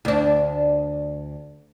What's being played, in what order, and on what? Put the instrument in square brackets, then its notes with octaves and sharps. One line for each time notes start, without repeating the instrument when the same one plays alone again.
[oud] D2 D4